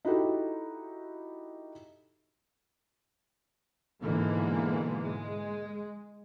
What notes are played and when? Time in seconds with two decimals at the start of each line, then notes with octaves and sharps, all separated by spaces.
0.05 D#4 E4 F#4 G4 A4
4.01 G#2 B2 D3 E3 G#3 A#3
5.00 G#3